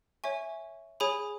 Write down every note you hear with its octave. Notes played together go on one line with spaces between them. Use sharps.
C#5 E5 G#5 C#6
G#4 C#5 G#5 B5 D#6